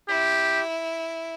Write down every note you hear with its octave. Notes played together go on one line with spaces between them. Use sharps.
E4 G4